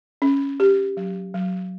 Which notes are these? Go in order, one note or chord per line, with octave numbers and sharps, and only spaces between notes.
C#4
G4
F#3
F#3